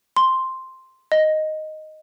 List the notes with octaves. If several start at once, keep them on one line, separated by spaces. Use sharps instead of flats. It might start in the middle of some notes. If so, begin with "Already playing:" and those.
C6
D#5